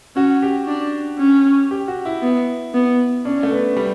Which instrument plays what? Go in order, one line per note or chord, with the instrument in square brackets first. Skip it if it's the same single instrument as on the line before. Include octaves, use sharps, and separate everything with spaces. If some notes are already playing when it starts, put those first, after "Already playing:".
[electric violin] C#4 [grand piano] F#4
[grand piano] G4
[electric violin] D4
C#4
[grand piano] G4
F#4
E4
[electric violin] B3
B3
[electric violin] C#4 [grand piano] D4
[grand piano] A3
B3
G3